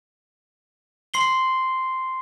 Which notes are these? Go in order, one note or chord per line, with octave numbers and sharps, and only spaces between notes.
C6 C7 G7